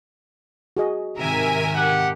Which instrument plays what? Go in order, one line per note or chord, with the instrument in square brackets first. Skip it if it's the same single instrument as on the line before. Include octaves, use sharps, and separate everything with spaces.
[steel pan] F#4 G#4 D#5
[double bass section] G#2 C3 D#3 [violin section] A#4 E5 G#5
[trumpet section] G4 F#5